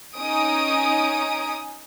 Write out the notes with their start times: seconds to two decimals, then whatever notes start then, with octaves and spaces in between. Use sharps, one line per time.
0.16 C#4 D#4 G#5 D#6 D7